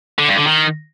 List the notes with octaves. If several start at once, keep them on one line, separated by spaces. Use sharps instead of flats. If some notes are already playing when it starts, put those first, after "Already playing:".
D3
G2
D3
D#3